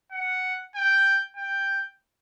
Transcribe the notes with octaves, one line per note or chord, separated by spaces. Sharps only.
F#5
G5
G5